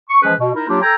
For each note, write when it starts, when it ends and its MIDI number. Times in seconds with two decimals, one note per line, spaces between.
0.09 0.20 85
0.23 0.33 52
0.23 0.33 53
0.23 0.33 56
0.23 0.33 61
0.23 0.33 68
0.23 0.33 71
0.39 0.50 47
0.55 0.68 63
0.55 0.68 64
0.55 0.68 70
0.68 0.80 54
0.68 0.80 58
0.68 0.80 62
0.68 0.80 65
0.68 0.80 67
0.82 0.95 69
0.82 0.95 79
0.82 0.95 80
0.82 0.95 82